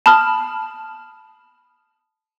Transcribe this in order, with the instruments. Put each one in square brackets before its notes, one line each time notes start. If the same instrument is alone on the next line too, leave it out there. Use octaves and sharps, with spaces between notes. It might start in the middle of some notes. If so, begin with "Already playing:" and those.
[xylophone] A5 B5 D#6 F6